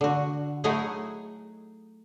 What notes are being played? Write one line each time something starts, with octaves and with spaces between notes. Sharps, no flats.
D3 F#4
F#3 A3 D#4 E4 F#4 G#4